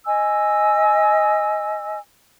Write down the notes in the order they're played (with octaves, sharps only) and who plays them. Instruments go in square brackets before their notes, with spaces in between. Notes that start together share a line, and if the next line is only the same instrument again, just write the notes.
[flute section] D#5 G#5 E6